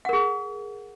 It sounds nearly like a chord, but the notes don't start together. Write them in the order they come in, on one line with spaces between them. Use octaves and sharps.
F#5 A#4 G#4